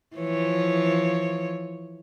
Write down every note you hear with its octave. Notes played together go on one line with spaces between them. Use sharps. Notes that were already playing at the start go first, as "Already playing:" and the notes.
E3 F3 C#5